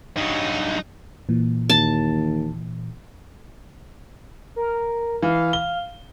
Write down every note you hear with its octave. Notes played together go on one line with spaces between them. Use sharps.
G2 F#3 D#4
A#2 E3
D#2 A5
A#4
E3 F5
G7